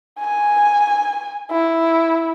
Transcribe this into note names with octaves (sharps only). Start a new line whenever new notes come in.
G#5
E4